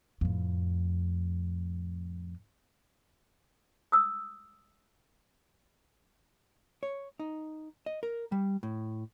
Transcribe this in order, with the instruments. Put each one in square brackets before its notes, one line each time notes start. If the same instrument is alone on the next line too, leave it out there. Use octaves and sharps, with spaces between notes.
[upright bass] F2 A2
[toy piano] D#6 E6
[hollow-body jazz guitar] C#5
D#4
D#5
A#4
G3
A2